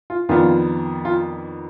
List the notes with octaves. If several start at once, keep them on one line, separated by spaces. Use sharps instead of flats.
F4
F2 D#3 B3 D4 F4
F4